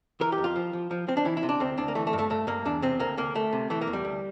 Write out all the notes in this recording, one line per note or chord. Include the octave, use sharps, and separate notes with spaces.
E3 A#4
G4
F2
F4
F3
F3
F3
F3 C4
D4
E3 E4
E4
C3
D4
D2 C4
D2 D4
A#3
E3 A3
A3
G2
A3
G2 A3
G2 A#3
E2 D4
C3 C4
D2 A#3
D2 A#3
D2 A3
C3
E3 A3
A#3
E2
G3
D2